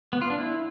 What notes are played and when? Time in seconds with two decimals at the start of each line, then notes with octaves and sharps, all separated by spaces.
0.13 B3
0.21 F4
0.30 D4
0.38 E4